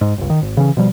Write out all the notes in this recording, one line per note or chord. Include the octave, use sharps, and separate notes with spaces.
G#2
G1 C#2
D#3
G#1
C#3 E3 C#4
B2 F3 G3